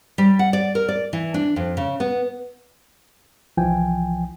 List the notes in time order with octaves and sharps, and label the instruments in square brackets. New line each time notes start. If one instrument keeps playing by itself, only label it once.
[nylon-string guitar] G3
F#5
D5
A#4
D5
E3
D4
F2
C#3
B3
[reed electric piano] C2 E3 F3 G5 G#5